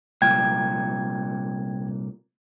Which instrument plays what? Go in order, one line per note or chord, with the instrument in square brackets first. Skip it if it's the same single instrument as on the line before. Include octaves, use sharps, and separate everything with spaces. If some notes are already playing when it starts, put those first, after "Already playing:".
[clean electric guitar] C2 A#2 [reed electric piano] G5 G#6